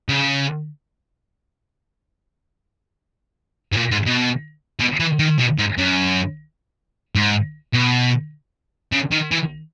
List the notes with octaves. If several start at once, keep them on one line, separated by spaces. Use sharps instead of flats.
C#3
G#2
A#2
G#2
B2
B2
E3
D#3
B2
G#2
F#2
G#2
B2
C#3
D#3
E3